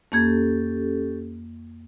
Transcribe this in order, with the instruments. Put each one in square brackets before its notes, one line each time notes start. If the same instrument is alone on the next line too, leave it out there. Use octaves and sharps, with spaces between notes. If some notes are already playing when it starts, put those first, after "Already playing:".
[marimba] F2 A#3 G#6 [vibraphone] C#4 G4 A4